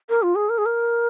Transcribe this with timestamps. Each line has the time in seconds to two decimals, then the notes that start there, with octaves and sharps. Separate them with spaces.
0.09 A#4
0.23 F4
0.35 G#4
0.49 A#4
0.58 G#4
0.66 A#4